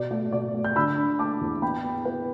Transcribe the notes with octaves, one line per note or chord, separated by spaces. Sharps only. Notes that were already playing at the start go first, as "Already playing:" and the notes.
Already playing: B2 D5
A3
B2 D5
A3
G6
D3 B5 E6
D4
A3 A5 D6
E2
B3 G5 B5
B3
B3 B4